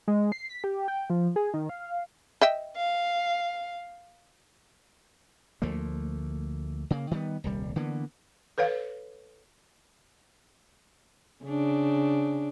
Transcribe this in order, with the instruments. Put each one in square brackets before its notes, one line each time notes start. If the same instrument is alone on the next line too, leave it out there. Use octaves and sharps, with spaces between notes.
[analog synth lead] G#3
C7
B6
G4
G5
F3
G#4
D#3
F5
[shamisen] D#5 E5 G5
[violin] F5
[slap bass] D2 F3 A3 A#3
C#3 A#3
D#3 G3 B3
D#1 C2 G3
D3 E3 A#3 B3
[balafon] A4 B4 C#5 F5
[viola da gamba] C#3 D4